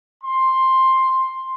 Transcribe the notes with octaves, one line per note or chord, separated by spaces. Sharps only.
C6